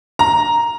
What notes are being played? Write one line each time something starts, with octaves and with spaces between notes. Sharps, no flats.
A#5